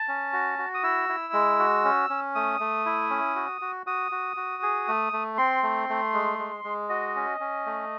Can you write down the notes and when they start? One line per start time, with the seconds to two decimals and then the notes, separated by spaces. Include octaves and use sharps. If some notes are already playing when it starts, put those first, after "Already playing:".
Already playing: A5
0.08 C#4
0.33 F#4
0.59 F#4
0.74 D#6
0.83 E4 E6
1.09 E4
1.33 G#3
1.59 F#4
1.85 C#4
2.10 C#4
2.35 A3 D#6
2.60 A3
2.86 E4
3.10 C#4
3.36 F#4
3.61 F#4
3.86 F#4 D#6
4.12 F#4
4.37 F#4
4.63 G#4
4.88 A3
5.13 A3
5.38 C4 C6
5.63 A3
5.89 A3
6.13 G#3
6.39 G#3
6.64 G#3
6.89 F#4 D#5
7.16 C#4
7.40 C#4
7.66 A3